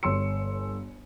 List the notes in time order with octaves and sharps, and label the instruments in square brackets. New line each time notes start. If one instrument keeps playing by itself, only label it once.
[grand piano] G1 C#5 C6 E6 C#7